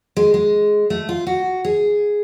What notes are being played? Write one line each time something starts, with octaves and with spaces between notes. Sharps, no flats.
G#3
G#3
A3
F4
F#4
G#4